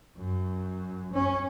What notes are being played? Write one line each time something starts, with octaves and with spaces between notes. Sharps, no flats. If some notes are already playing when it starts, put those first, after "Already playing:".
F#2
C#4